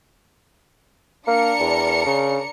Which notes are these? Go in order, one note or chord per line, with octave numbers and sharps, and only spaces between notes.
A#3 D4 A#4 C#7
E2
C#3